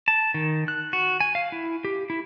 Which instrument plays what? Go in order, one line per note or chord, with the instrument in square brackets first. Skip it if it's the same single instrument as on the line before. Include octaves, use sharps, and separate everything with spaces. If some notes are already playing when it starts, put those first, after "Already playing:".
[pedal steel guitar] A5
D#3
F#6
F#4
G#5
F5
E4
G4
E4